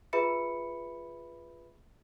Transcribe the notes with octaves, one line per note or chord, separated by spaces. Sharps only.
F4 G#4 B4 E5 B5 C#7